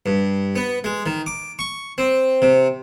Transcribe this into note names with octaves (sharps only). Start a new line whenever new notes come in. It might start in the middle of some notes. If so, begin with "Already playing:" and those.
G2
B3
G#3
D#3
D6
C#6
C4
C3